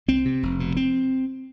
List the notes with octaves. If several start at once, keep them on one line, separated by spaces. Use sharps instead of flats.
C2 C4
C3
F1
B2
C4